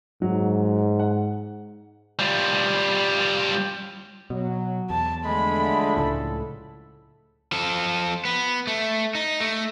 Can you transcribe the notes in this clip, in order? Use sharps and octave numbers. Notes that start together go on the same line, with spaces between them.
G#2 F#3
F#5
G3 F4
B2 F#3
E2 A5
D3 F3 G#3 A3 B5
C#2 A2 A4
F3 A4
B3
A3
D#4
A3